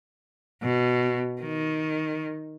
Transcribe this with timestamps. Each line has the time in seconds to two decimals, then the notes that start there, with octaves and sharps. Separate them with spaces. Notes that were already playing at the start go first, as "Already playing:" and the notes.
0.63 B2
1.42 D#3